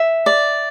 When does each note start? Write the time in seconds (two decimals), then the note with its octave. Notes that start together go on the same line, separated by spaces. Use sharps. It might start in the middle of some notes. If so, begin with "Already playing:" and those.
Already playing: E5
0.26 D5